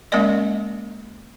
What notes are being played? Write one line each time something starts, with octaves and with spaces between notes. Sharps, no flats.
G#3 A#3 C#4 A#4 D5 D#5